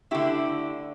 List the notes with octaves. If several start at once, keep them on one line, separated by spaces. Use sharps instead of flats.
D3 A3 E4 G4